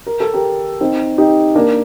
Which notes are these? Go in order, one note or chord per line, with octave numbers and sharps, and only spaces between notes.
A#4
A4
G4 A#4
C4 D#4
D#4 G4
A#3 D4